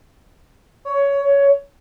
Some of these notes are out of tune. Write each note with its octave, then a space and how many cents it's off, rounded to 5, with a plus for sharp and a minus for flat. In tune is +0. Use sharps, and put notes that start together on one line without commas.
C#5 +15